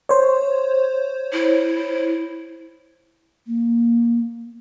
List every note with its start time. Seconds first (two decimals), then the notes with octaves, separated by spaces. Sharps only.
0.09 C5 C#5
1.33 E4
3.47 A#3